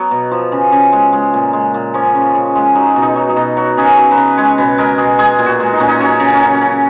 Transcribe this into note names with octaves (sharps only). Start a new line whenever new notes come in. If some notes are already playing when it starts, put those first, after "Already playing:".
Already playing: F#3 B3
B2
F3
C#3
C#3
G#3
G#3
A#2
G#3
A#2
F3 C#4
C#3
C#3
G#3
F#3 D#4
B2
D#4
F#3
D#4
B2
F#3 F#4
C#3 G#4
A#4
F#3
B4
C#3
G#3 C#5
B2 B4
G#3 A#4
B2 G#4
G#3 G#4
A#2
F#4
G#3
D#4
A#2 C#4
D#4
F#3 C#4
C#3
C#4
F#3
C#4
C#3